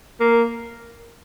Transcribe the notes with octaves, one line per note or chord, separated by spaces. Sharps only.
A#3